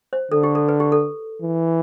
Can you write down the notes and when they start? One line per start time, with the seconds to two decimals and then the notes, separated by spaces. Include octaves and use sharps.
0.13 C5
0.31 D3 A4
0.43 G4
0.55 A4
0.69 B4
0.80 G4
0.92 A4
1.42 E3